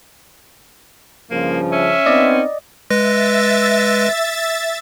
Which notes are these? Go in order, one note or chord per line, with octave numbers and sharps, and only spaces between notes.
G2 C#3 F3 A#3
C#4 E5
B3 C4 D#4 D5 D#5
G#3 B4 E5 A6 A#6